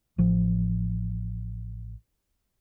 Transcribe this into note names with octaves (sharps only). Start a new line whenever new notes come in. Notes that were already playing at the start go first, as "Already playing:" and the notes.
A1 F3